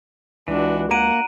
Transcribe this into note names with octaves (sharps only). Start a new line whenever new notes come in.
C#2 E3 D4 F#4
A#3 F#5 A#5 D7 D#7